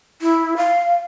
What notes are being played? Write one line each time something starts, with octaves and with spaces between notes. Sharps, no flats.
E4
F5